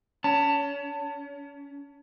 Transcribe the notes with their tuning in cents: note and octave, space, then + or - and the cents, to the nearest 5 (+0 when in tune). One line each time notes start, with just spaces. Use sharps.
C#4 +30 A5 +20